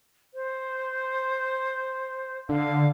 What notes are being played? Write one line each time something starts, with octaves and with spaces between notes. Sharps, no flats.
C5
D3 F5